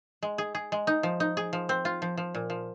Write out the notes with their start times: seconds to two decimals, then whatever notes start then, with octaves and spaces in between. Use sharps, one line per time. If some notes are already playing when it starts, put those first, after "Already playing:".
0.23 G#3
0.38 G#4
0.55 G#4
0.72 G#3
0.87 D#4
1.03 F3
1.20 D#4
1.37 G#4
1.53 F3
1.69 C4
1.85 F4
2.02 F3
2.17 F3
2.35 A#2
2.50 F3